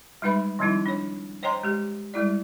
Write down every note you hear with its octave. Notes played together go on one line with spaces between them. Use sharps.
G3 G#3 D#4 B4 E5 B5
D#3 F3 G3 C4 D#4 E4
D4 C#5
C5 C#5 D#5 G5 A#5 C6
G#3 G4
G3 G#3 E4 D5